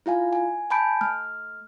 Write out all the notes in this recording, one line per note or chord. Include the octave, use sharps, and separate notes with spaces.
E4 F4 F5 G#5
G#5
G#5 A5 B5 G6 D7
A3 F6